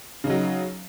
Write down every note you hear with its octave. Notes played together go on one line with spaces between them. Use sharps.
C#3 F#3 D#4